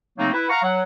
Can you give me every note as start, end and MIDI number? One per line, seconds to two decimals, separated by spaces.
0.18 0.32 49
0.18 0.32 54
0.18 0.32 57
0.18 0.32 58
0.18 0.32 60
0.18 0.32 63
0.33 0.46 64
0.33 0.46 71
0.49 0.61 77
0.49 0.61 78
0.49 0.61 82
0.49 0.61 85
0.63 0.83 54
0.63 0.83 78